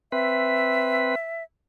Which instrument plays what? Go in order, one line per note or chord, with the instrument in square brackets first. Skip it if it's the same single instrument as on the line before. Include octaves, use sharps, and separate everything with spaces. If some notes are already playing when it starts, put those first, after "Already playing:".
[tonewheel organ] C4 B4 [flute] E5